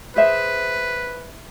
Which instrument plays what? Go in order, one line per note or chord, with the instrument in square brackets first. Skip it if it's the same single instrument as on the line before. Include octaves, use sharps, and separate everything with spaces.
[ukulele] G#4 C5 E5 [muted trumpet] B4